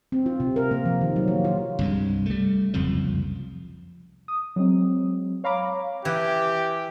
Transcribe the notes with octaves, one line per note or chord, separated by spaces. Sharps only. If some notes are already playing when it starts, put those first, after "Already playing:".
C4
F4
C3
A#4
A#3
F3
D#3
F#3
A#3
F4
C2 G2 G#3
G3 A3
F#1 C2 F2 F3
D#6
F#3 G#3 C4
C#5 F5 A#5 B5 D6
E3 G4